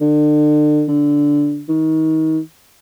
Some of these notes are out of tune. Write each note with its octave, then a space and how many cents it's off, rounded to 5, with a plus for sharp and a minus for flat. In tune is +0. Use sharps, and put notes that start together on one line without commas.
D3 +35
D3 -5
D#3 +30